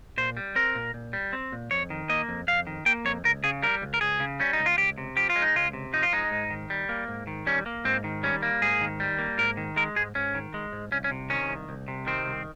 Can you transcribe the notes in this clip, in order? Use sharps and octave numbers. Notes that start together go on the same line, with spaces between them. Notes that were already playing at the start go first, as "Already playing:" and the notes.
A#2 C5
G3
C4 A#4
A#2
A#2
G3
C4
A#2
F2 C#5
D#3
A#3 D#5
F2
F2 F5
D#3
A#3 G5
F2 C#5
C#2 A#4
C#3 G#4
G3 A#4
C#2
A#4
C#2 G#4
C#3
G3 C#4
D#4
C#2
F4
C#2 G4
C3
F3 G4
F4
G#3
D#4
C#2 F4
C3
F3 D#4
F4
G#3 D#4
G#2
D#3
G3
A#3
G#2
D#3
G3 C#4
A#3
G#2 C4
D#3
G3 C#4
A#3
G#2 G#4
D#3
G3
A#3
G#2 A#4
D#3
G#3 A#4
G#2 G#4
G#2 C#4
D#3
G#3
G#2
C2 C#4
C#4
C3
D#3 C#4
C2
C2
C3
D#3 C4
C2